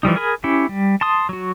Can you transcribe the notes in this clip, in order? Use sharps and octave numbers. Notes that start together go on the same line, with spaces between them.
E3 F3 G3 D#4
G#4 A#4 G#5 B5
C#4 E4 G4
G3
A5 C6 D#6
F#3 F#4